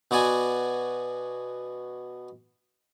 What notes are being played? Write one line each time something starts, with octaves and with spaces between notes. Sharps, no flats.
B2 B3 F#4 D5 G#5